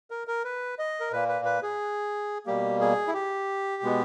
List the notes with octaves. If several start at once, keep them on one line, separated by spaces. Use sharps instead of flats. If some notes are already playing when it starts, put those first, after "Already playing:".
A#4
A#4
B4
D#5
A#4
A#2 A#3 B4
B4
B4
G#4
B2 G3 A#3 G4
G#4
E4
G4
B2 G#3 B3